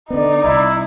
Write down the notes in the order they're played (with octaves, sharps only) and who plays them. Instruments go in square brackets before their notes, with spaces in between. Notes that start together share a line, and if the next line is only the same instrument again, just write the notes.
[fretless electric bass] D3 B3 [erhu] D#4 [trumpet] D5
[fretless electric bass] C2 [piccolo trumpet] E4